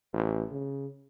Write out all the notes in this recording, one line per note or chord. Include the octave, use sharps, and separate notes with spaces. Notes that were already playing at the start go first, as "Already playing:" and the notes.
A1
C#3